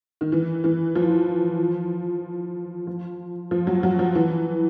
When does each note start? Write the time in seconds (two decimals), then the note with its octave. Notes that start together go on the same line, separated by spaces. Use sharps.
0.21 D#3
0.32 E3
0.64 E3
0.95 F3
2.87 F3
3.51 F3
3.67 F#3
3.83 F#3
3.99 F3
4.15 E3